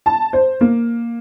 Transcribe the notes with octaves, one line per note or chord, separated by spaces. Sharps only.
A5
C5
A#3